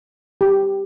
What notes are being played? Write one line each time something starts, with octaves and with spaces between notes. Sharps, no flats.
G4